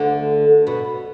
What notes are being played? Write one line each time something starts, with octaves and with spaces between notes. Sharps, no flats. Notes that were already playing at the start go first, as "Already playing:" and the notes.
Already playing: D2 D3
B2